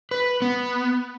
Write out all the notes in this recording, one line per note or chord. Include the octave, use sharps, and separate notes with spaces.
B4
B3